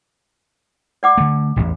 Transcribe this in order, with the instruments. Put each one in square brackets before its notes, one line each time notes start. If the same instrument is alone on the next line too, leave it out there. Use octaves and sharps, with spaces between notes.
[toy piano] D5 F#5 D6
[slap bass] D3 A3
D#1 A1 E2